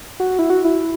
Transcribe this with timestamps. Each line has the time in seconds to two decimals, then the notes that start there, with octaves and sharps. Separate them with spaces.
0.20 F#4
0.39 E4
0.50 F#4
0.65 E4